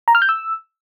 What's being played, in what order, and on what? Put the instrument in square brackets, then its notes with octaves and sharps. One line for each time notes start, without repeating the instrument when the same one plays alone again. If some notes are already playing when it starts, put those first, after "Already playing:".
[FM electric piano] A#5
F6
G6
E6